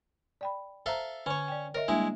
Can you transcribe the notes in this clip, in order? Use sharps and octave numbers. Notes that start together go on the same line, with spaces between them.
D5 G5 B5
A4 C5 E5 F5 A#5
D3 C#4 C#5
D5 G5
A#4 C#5 D#5 E5
G3 G#3 A#3 D4 E4